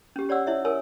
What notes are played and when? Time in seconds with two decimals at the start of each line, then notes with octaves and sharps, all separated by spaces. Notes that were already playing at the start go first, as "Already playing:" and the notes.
0.16 C#4 G4
0.29 G4 C#5 D5 F#5 E6
0.47 E4 C#5 E5
0.65 A#4 C#5 G#5 E6